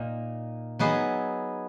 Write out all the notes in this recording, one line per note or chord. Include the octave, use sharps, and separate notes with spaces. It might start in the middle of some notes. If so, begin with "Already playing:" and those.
Already playing: A#2 A#3 D#4
F#3 B3 D#4 G#4